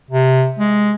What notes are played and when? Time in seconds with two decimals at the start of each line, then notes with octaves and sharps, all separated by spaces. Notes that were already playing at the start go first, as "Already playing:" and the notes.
0.10 C3
0.59 G#3